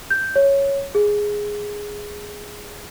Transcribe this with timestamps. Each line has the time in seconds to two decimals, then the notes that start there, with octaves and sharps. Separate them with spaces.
0.10 G6
0.36 C#5
0.95 G#4